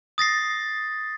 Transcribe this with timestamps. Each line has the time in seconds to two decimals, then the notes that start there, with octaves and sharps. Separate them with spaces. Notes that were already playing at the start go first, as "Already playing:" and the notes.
0.18 D#6 A6 A#6 C7